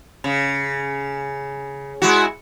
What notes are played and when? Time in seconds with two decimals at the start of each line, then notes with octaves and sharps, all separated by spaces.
0.24 C#3
2.02 G#3 E4 F#4